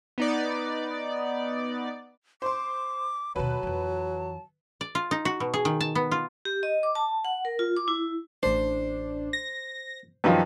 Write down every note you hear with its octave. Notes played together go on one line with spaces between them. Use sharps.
B3 D#4 D5
C5 C6 D6
D#2 B2 F#3 B4 A5
F2 E3
D5
F4
D#4
F#4
B2
G#4
D#3
A5
B3
F4
G4
D#5
D6
A5
F#5
A#4
F4
D6
E4
A1 D4 C5
A#6
F#2 D#3 F3 G3 B4